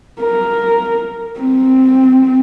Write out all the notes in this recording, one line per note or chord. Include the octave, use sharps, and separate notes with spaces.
A#4
C4